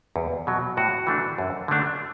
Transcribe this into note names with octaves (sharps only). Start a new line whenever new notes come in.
E2
B2 F#3
A2 F#4
E3 A3 D4
F#2
D3 A3 D4